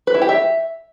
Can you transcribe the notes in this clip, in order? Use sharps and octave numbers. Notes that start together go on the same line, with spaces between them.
B4
E4
G4
E5